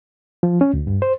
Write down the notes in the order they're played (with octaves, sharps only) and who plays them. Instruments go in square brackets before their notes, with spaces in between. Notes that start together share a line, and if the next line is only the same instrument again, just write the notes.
[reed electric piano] F3
C#4
D2
G2
C5